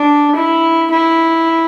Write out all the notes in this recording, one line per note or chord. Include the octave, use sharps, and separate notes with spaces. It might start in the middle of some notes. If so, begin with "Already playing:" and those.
Already playing: D4
E4
E4